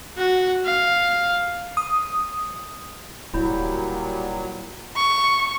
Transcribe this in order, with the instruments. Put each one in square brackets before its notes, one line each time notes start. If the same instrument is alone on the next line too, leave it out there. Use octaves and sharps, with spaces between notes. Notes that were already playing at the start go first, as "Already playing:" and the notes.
[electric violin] F#4
F5
[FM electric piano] D#6
[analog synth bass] D1 [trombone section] A#2 G3 [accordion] F#3 [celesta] E4 B5 G6
[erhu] C#6